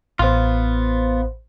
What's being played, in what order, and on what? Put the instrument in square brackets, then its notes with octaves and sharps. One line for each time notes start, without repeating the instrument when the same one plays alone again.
[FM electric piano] A1 C5 [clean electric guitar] B3 F4